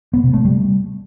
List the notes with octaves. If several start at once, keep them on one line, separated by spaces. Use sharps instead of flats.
B3
C3
A3
G3